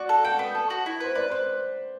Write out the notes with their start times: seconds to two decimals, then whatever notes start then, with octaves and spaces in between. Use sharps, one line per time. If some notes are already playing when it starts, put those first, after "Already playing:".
Already playing: F#4 D5
0.09 A4
0.24 F#5 G5
0.39 B3
0.55 A4
0.70 F#4
0.86 E4
1.00 B4 C5
1.15 B4 D5
1.31 B4 C5